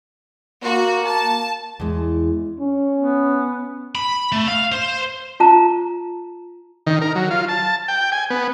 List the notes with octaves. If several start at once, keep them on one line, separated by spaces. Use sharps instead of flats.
A#3 F#4
A5
E2 G#3
C#4
B3
B5
A3
F5
C5
F4 A5 A#5
D#3
A#4
F#3
F4
A5
G5
G#5
B3